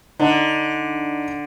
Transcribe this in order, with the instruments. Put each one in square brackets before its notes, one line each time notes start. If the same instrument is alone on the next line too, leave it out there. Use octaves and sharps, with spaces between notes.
[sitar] D3 [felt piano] D4 D#4